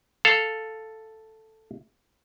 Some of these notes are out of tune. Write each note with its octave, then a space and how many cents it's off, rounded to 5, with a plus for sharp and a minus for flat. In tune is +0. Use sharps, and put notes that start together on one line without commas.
A4 +0 F5 +0